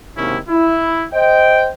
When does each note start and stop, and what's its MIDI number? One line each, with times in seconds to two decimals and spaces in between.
0.17 0.37 44
0.17 0.37 48
0.17 0.37 51
0.17 0.37 58
0.17 0.37 61
0.17 0.37 64
0.49 1.06 64
1.14 1.69 72
1.14 1.69 75
1.14 1.69 79